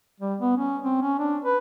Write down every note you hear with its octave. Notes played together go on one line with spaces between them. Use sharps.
G3
B3
C#4
C4
C#4
D4
B4